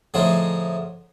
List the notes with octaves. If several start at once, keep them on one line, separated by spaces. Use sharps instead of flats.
A2 D3 F3 A3 D#4 G#4